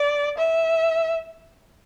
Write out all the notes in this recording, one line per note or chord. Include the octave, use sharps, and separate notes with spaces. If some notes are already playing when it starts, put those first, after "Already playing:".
Already playing: D5
E5